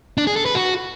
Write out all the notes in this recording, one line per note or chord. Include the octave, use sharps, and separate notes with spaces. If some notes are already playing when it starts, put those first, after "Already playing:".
D4
G#4
A4
B4
F#4